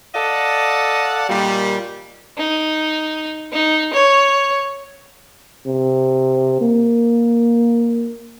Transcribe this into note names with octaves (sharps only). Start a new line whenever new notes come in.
A4 D5 D#5 F5 F#5
A#2 D#3 G3
D#4
D#4
C#5
C3
A#3